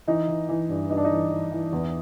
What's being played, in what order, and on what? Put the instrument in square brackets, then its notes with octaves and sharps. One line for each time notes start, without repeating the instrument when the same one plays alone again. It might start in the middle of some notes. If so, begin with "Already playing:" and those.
[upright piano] E3 D#4
E3
E3
G2
G2 D#4
D4
D#4
E3
E3
E3
E2